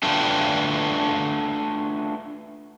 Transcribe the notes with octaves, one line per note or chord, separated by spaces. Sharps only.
A3 D4 F4 F#4 B4 G5